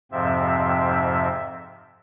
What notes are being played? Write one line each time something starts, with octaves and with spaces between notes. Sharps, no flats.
F2 G#2 C3 F3 C4 E5